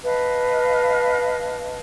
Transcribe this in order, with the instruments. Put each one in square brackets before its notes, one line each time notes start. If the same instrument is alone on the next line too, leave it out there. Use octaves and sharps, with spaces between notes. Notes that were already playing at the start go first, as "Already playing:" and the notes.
[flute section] B4 D#5 F5 A5